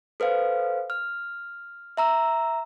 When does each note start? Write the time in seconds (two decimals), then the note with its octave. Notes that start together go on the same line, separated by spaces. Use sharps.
0.20 A4 B4 C5 F5
0.90 F6
1.97 E5 A#5 E6